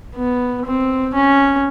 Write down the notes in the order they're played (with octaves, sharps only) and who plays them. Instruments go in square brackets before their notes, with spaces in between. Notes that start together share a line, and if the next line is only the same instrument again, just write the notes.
[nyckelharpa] B3
C4
C#4